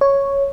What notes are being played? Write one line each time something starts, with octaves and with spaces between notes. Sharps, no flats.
C#5